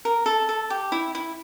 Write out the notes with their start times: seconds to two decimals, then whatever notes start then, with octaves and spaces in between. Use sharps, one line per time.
0.05 A#4
0.26 A4
0.49 A4
0.70 G4
0.92 E4
1.15 E4